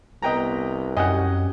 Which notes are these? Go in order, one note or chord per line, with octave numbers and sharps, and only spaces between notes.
C2 B3 B4 D#5 G5 A#5
F#2 C#4 G4 D#5 F#5 G#5